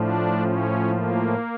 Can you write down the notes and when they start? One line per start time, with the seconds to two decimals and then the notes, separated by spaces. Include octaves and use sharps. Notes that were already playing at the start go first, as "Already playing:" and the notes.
Already playing: A2 F3 D4
0.41 C#4
0.89 A#3